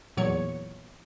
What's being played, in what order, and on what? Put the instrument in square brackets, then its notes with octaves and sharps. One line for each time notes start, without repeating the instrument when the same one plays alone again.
[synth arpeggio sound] E2 A#2 F#3 C#5 G#6 C#7